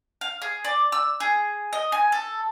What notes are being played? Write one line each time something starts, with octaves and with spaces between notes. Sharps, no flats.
F5
G#4
D5
E6
G#4
D#5
G#5
A4